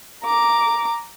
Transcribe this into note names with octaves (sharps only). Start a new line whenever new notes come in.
A#5 D6